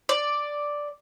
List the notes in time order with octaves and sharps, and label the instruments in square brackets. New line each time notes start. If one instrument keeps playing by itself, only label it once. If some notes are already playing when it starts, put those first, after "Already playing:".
[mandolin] D5